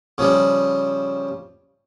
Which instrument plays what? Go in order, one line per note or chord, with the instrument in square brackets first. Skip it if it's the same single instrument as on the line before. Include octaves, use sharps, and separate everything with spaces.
[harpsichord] C#3 F3 G3